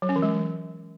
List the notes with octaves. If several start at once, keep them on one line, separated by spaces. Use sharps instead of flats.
F#3
C#4
E3
G#3